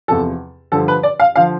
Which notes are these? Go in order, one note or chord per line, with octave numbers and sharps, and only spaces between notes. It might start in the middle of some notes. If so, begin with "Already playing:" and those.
E2 C3 F3 A4
G2 D3 F3 A4
B4
D5
F5
D3 F3 F5